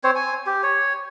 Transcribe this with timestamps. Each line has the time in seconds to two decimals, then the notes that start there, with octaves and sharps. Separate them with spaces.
0.04 C4 C5 C#5
0.15 G#5
0.47 G4
0.63 C#5